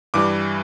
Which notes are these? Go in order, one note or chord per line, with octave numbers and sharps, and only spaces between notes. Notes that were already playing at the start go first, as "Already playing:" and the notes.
G2 E3 G3 D6